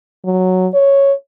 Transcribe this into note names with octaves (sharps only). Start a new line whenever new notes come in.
F#3
C#5